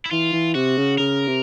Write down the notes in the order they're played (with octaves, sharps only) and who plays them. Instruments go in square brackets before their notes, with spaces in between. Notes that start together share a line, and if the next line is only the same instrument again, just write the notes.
[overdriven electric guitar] E4
[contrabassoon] E3 [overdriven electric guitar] F4
[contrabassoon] E3
[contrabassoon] C3 [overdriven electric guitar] F#4
[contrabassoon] C#3
[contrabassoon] C#3 [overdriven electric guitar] A#4
[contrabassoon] C3